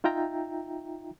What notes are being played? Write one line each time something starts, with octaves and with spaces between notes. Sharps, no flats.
D#4 F4 E5 G5 A#5